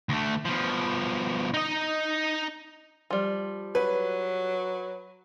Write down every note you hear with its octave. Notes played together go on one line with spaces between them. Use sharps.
D2 A3
B2 F3
D#4 D#5
F3 G3
F#3 B4